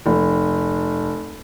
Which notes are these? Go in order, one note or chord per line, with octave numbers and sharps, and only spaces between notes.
F1